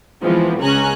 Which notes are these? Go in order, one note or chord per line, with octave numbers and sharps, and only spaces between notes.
E3 F3 G#3 B3 C4
C#2 C#4 G#4 G#5 A#5 F#6